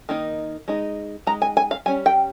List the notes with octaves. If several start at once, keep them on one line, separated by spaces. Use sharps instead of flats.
D#3 A#3 D#4
G#3 D#4
G#3 D#4 A#5
G#5
G#5
F5
G3 C#4 G#5
G5